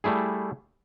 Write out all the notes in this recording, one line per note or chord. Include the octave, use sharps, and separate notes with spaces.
G3 A3 E4 G#4